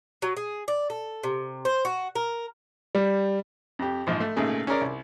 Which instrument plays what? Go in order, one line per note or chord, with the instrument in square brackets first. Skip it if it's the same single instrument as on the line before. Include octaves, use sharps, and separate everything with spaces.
[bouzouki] F#3
G#4
D5
A4
C3
C5
F#4
A#4
[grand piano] G3
[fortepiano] F2 G4
A#1 G#2 F3
A3
G#1 A#2 C#3 A3 G#4
C#4 G#4 A#4 D5
C2